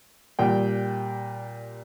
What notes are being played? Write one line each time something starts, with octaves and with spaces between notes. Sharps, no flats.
A#2 G3 G5